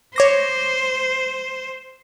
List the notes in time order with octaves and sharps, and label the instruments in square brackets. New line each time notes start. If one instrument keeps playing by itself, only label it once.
[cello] C5 [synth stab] C#5 D6 A#6